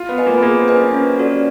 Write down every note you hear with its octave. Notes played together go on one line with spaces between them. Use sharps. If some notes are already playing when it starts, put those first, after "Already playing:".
Already playing: F4
B3
B4 D#5 G#5
A#3
B3
A#3 G#4
C4
B4 D#5 G#5
C#4
C#4
F#4 A4 D5